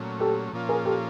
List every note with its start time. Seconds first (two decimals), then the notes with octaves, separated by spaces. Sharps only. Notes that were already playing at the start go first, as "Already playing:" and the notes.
Already playing: A#2 F#3 A3 C#4
0.20 G4 A4
0.53 A#2 F3 A#3 C#4 F4
0.69 G#4 A#4
0.85 G4 A4